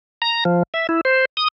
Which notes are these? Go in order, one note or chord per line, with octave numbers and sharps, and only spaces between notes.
A#5
F3
E5
E4
C5
D#6